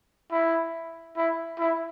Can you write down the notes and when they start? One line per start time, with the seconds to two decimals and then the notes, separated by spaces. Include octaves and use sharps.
0.31 E4
1.16 E4
1.59 E4